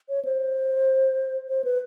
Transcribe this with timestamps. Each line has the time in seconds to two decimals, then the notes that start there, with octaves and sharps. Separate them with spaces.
0.09 C#5
0.25 C5
1.48 C5
1.64 B4